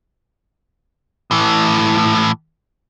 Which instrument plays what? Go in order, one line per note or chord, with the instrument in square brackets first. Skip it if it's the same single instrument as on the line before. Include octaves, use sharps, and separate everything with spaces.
[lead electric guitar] A2 E3